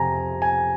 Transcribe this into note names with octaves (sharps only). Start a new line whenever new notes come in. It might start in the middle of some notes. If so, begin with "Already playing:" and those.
Already playing: F2 C3 F3 G5 G#5 A#5
G#5